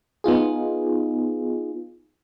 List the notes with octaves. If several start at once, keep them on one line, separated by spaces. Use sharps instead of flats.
B3 D#4 F4 G#4